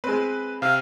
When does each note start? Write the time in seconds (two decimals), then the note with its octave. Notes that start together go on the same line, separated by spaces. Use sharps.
0.04 G#3 C4 B4
0.62 C3 F5